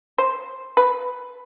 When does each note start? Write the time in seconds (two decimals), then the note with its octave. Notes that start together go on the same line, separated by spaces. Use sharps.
0.18 C5
0.77 B4